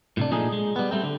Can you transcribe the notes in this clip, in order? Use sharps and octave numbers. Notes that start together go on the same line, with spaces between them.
A2 C3 D4
A#2 F3 A3 D4 D#4 G#4
G#3
G3 B3
G3 A3 C4
D3